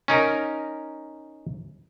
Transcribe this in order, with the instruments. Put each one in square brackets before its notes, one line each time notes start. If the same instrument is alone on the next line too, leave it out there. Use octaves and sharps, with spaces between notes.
[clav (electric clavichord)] C#4 D#4 A#4